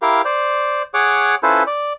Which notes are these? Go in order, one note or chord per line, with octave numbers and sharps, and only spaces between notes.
E4 G4 A#4 F5
C5 D5
G#4 C#5 F#5 D6
C#4 E4 F4 A4 B4 C5
D5